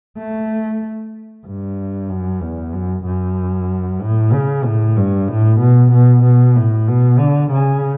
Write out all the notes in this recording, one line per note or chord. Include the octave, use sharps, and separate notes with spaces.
A3
G2
F#2
E2
F#2
F#2
A2
C#3
A2
G2
A2
B2
B2
B2
A2
B2
D3
C#3